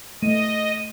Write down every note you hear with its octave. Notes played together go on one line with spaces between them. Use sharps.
A3 D#5 D#7